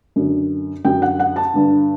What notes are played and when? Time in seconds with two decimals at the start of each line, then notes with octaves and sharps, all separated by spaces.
0.16 F#2 D3
0.85 F#2 D3 G5
1.02 F#5
1.20 F#5
1.36 A5
1.53 G2 D3